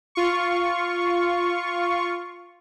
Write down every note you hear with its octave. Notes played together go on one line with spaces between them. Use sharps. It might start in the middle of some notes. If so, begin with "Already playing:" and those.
F4 C#6